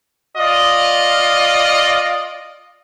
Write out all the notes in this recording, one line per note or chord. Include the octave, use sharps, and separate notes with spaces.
F4 D5 D#5